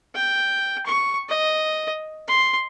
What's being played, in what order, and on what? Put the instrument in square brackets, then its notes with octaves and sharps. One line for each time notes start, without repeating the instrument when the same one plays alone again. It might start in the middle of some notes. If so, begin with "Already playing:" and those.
[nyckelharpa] G5
C#6
D#5
C6